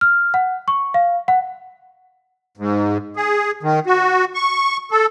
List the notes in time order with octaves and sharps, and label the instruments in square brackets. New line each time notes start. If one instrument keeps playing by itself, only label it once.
[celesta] F6
F#5
C#6
F5
F#5
[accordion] G#2
G#4
D#3
F#4
C#6
A4